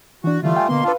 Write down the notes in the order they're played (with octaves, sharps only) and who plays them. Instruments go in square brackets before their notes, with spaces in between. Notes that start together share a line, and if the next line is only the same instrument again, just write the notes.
[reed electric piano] E3 D4 [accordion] F#4
[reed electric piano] D3 E3 [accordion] G3 A3 F4
[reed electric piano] G5 G#5
[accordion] B2 A#3 C6 [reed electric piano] D3 B3
[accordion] D4 F4 A4 [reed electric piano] B4 F5